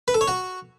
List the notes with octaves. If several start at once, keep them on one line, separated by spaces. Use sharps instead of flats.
B4
A4
C#5
F#4